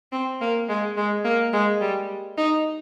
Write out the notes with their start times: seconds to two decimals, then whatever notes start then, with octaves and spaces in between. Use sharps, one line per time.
0.12 C4
0.41 A#3
0.69 G#3
0.97 G#3
1.24 A#3
1.53 G#3
1.81 G3
2.38 D#4